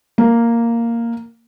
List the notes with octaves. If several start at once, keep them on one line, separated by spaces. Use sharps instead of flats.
A#3